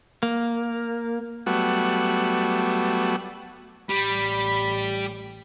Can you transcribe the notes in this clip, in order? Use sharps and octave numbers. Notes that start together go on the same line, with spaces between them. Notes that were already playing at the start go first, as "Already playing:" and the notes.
A#3
F#3 G3 A3 B3 F#4
A1 G3 B5